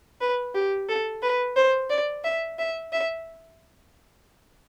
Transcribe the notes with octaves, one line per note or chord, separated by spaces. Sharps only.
B4
G4
A4
B4
C5
D5
E5
E5
E5